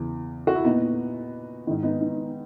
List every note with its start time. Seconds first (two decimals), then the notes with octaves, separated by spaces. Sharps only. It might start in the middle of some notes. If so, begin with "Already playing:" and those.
Already playing: E2 C#3 E3
0.47 F#4
0.55 E4
0.65 A#2 B3 D#4
1.67 G#2 D#3
1.83 B3 D#4
2.01 B3 D#4